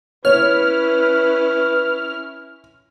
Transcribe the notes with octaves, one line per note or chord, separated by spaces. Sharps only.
C#4 E4 B4 C#5 F6